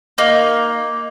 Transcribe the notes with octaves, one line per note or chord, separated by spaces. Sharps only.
A#3 D#4